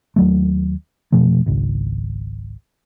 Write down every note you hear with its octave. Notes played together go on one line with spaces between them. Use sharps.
D#2 F#3 A3
F1 B2 F3 A3
G#1 C#2